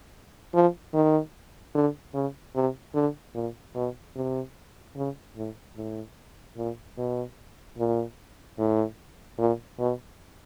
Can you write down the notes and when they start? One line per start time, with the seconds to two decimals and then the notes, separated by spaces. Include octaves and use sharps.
0.54 F3
0.94 D#3
1.75 D3
2.14 C#3
2.55 C3
2.94 D3
3.35 A#2
3.75 B2
4.16 C3
4.96 C#3
5.36 A2
5.77 A2
6.57 A#2
6.97 B2
7.78 A#2
8.59 A2
9.39 A#2
9.79 B2